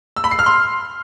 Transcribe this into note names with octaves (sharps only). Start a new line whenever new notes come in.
E6
B5
C7
F6
C6